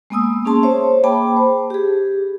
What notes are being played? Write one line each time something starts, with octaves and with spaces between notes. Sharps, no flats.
G#3 A#3 B3 G#5 D#6 E6
A#3 C#4 G#4 A5 C6
C5 C#5 E5
A#3 G#4 G5 A5 B5 D6
C5
G4 G#4